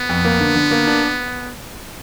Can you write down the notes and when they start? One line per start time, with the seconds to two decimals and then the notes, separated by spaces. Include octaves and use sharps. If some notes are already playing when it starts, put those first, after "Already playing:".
Already playing: B3
0.09 F2
0.25 A#3
0.40 D3
0.55 D3
0.71 A#3
0.87 D4